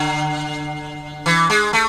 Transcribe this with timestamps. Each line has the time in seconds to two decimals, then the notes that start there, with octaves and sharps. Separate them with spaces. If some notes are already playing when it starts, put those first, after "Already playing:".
Already playing: D3
1.26 E3
1.50 G#3
1.73 A3